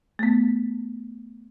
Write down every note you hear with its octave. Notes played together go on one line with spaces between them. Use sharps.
A3 B3